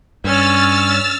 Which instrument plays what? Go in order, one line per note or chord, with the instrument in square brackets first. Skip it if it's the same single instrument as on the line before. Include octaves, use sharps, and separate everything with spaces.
[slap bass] G2 [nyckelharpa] C#4 [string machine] E6 F6 A6